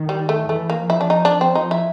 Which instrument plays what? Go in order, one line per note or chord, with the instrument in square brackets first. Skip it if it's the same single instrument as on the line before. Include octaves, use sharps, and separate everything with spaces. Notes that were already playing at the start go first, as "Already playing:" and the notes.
Already playing: [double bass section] D#3
[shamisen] G3
A3
[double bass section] E3 [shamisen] A3
[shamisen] A#3
[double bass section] F3
[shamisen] E4
D4
D#4
D4
C4
D#4
E4